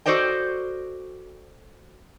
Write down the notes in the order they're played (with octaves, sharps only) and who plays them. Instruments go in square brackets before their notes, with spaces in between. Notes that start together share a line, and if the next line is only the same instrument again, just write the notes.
[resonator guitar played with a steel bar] F#4 A4 C5 D5 D#5 G5